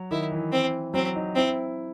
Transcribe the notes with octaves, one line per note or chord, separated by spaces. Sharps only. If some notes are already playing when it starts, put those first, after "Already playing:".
Already playing: F#3
D#3 E4
E3
C4
F#3 C4
D#4
C4 E4